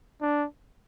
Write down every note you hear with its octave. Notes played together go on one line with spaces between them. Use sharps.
D4